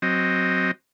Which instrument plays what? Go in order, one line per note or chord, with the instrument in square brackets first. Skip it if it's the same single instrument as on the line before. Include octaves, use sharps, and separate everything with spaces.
[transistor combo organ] F#3 C4 D#5